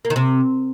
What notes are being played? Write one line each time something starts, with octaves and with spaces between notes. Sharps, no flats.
A#3
D#3
C3